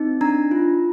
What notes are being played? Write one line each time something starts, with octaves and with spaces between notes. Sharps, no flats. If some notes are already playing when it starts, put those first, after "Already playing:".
Already playing: C4 D#4
D4 A#5
F4